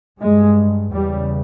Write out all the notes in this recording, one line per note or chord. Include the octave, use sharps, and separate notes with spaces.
G2 G#3
E2 C#3 G3